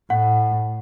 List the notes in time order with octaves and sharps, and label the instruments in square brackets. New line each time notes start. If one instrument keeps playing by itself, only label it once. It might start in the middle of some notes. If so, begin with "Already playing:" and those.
[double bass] A2 [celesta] F#5